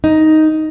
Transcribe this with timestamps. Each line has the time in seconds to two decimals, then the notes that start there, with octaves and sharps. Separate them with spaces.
0.04 D#4